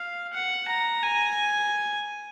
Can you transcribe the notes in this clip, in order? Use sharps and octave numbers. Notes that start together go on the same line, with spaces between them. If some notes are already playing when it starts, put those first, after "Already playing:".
Already playing: F5
F#5
A#5
G#5